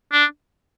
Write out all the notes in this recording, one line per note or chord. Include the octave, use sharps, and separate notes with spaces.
D4